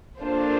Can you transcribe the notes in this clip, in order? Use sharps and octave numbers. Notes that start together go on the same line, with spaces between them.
A#3 D4 F4 A4 C5